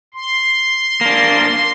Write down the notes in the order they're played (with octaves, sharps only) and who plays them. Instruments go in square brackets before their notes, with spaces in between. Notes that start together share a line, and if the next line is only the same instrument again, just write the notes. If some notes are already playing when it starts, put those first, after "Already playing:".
[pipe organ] C6
[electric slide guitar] A#3 D4